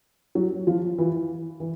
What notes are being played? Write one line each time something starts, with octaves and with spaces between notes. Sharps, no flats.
F#3
F3
E3
E3